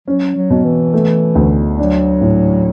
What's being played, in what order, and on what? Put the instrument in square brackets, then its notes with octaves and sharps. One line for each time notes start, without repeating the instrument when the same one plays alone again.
[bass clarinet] F#3 [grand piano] C#4
[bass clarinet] F#3
[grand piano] B2
[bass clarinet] E3
[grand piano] A3
D2
[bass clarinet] F#3 [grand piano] D4
[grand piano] A2